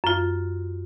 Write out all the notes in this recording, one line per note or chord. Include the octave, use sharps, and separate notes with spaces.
F#2 F4